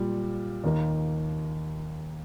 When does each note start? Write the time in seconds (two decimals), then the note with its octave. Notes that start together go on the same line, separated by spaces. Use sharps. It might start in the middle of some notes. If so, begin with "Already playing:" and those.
Already playing: A#2 G3
0.64 D#2 D#3 A#3 D#4 A#4